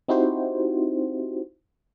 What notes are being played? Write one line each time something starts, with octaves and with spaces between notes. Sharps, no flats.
C4 D#4 E4 F#4 G4 C5